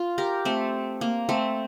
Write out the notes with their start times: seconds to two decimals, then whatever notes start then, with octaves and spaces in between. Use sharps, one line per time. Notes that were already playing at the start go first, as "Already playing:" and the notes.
Already playing: F4
0.18 G4 A#4
0.45 A3 C4
1.01 A#3
1.29 A3 C4